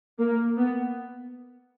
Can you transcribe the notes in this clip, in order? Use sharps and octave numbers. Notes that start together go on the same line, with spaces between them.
A#3
B3